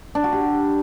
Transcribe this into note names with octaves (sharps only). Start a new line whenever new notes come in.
D4
F#4
G4